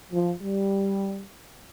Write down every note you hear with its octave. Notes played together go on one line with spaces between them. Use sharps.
F3
G3